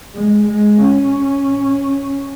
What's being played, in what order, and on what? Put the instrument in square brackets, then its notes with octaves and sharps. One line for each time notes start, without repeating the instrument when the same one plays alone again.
[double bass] G#3
G#3
C#4